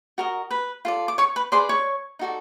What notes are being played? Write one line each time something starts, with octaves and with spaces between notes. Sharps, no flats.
F#4 A#4 D#5
B4 B5
F4 A4 D5
D6
C#5 C#6
B4 B5
G#4 B4 C5 D5 C6
C#5 C#6
D#4 F#4 A4 D5